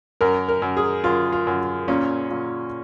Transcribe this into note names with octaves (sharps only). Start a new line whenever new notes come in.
F#2 A#4
A#4
F#2
G#4
F#2 F4
F4
F#2
A#2 C#4
A#2